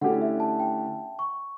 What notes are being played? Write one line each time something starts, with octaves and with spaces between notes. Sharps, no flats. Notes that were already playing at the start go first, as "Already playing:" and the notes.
D3 A3 C#4 E4 G4 F#5
E5
A5
G5
C#6